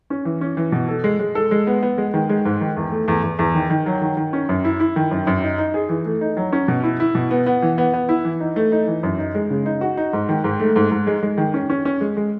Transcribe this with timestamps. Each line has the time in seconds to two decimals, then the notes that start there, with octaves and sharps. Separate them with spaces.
0.10 C#4
0.25 E3
0.41 C#4
0.57 E3
0.72 B2
0.88 A4
1.04 G#3
1.19 G#3
1.35 A4
1.51 G#3
1.67 B3
1.83 B3
1.98 G#3
2.14 D#3
2.29 G#3
2.45 G#2
2.61 D#3
2.76 E2
2.92 A3
3.08 E2
3.23 E2
3.39 E2
3.55 D#3
3.70 D#3
3.86 F#3
4.02 D#3
4.17 D#3
4.33 C#4
4.49 F#2
4.64 E4
4.80 E4
4.96 D#3
5.11 F#2
5.27 F#2
5.43 D#4
5.58 D#4
5.74 G#4
5.89 E3
6.05 A3
6.21 D#4
6.37 F#3
6.53 C#4
6.68 B2
6.83 E4
7.00 E4
7.15 B2
7.31 B3
7.46 B3
7.62 E3
7.78 B3
7.94 B3
8.09 E4
8.25 E3
8.40 D#4
8.56 A3
8.72 D#4
8.88 E3
9.03 F#2
9.19 D#4
9.35 G#3
9.50 C#3
9.66 D#4
9.81 F#4
9.97 D#4
10.13 G#2
10.29 D#3
10.44 G#2
10.60 A3
10.76 G#2
10.91 G#2
11.07 G#3
11.23 G#3
11.38 D#3
11.54 C#4
11.70 C#4
11.85 C#4
12.01 G#3
12.17 G#3